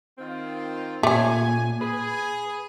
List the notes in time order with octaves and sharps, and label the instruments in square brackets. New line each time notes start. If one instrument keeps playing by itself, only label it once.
[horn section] D#3 C4 F4
[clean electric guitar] A#2 [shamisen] A3 C#4 [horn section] G#5
[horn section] G#4 [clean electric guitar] B4